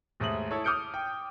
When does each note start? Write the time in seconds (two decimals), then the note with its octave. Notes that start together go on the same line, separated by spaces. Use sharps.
0.20 D#2 G#2 A3 D#6 F#7
0.51 E4 A4 C#5
0.64 D6 D#6 F6 G6 C#7 D7
0.94 G5